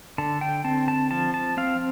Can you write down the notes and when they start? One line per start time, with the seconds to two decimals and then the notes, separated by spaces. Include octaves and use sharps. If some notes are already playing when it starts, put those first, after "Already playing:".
0.18 D3 A5
0.41 G5
0.64 C4 A5
0.88 A5
1.11 F3 A5
1.34 A5
1.57 C4 F5